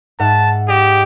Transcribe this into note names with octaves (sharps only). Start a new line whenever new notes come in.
G#2 E5 F#5 A5
G4 D#5